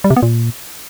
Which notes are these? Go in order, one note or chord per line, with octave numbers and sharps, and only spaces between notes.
G3
C3
B3
A#2